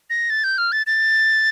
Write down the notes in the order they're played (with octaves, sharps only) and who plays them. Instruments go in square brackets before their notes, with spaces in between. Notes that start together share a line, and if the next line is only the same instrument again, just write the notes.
[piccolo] A#6
A6
G6
F6
A6
A6